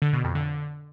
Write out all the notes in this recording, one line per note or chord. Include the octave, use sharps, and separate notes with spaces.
D3
B2
F2
D3